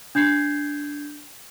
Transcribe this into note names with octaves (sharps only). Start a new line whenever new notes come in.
D4 G6 G#6 C7